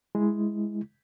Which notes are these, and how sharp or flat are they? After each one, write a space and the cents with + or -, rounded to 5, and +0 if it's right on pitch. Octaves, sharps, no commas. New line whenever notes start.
G#3 +0 E4 -5